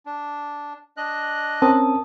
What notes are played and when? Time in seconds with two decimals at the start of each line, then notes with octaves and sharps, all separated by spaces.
0.06 D4
0.97 D4 D#5 F#6
1.62 C4 C#4 A#4 A5 D#6